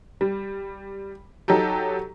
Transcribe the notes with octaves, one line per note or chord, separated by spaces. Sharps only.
G3
F#3 D#4 G4 A4